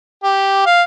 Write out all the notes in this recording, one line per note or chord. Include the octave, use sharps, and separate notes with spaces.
G4
F5